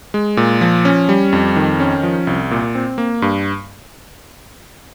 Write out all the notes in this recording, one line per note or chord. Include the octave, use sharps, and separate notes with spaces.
G#3
A#2
F3
C#4
G3
F2
D#3
C#4
F3
C2
A#2
C4
A#3
G2